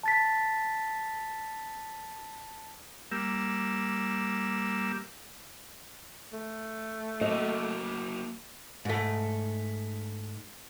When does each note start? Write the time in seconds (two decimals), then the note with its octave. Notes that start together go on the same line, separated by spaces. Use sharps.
0.03 A5 A6 B6
3.12 G3 A#3 E6
6.33 A3
7.21 F#3 A#3 D#5
8.85 G#2 A3